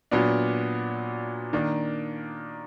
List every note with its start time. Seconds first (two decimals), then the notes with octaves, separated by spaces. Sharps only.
0.11 A#2 F#3 B3 D4
1.53 D#3 A#3 D4